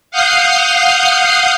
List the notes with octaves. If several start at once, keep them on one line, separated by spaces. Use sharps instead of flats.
F5 F#5 D#6 F6 G6 C7